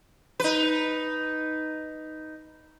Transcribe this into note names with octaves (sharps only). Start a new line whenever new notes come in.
D#4 B4